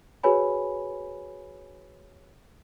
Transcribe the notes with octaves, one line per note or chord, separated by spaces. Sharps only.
F#4 G#4 B4 C#5 G#5 B5